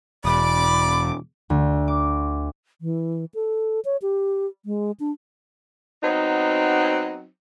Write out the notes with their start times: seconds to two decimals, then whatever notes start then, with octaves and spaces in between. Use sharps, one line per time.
0.25 E1 D5 B5 D6
1.50 D2
1.88 D6
2.81 E3
3.35 A4
3.85 C#5
4.02 G4
4.66 G#3
5.00 D4
6.03 F#3 B3 C4 D#4